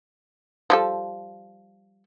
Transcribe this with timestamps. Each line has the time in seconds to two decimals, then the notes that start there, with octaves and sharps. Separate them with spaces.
0.70 F3 G3 A4